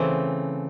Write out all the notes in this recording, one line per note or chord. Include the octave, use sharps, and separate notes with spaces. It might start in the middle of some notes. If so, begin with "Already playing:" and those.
Already playing: C#3 E3 A3 C4